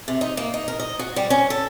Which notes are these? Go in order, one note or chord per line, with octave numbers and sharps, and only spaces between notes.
C3
D#4
A#3
D#4
A#4
D#5
F#4
G3
C#4
A4